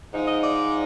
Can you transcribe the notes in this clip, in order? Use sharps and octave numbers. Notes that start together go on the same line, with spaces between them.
G#2 F3 G#3 D#4
D#5
D5